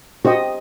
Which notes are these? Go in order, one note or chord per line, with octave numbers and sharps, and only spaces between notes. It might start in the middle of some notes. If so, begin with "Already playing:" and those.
F#4 G4 C5 D#5